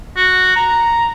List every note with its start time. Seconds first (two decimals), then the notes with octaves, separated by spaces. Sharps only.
0.16 F#4
0.56 A#5